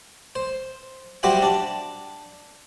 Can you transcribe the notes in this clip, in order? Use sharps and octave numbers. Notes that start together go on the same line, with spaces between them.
C5
G3 F#4 G4 C5 E5 F#5
D4